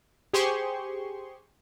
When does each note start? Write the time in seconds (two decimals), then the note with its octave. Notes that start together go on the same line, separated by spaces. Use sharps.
0.33 G4 G#4 C5 C6 C#6